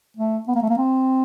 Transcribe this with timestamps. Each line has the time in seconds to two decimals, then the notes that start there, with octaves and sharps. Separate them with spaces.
0.17 A3
0.48 B3
0.55 A#3
0.63 A3
0.69 A#3
0.78 C4